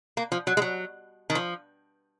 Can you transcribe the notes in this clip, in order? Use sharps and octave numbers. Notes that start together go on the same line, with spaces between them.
A#3
F3
F#3
G#3
F#3
D#3
F3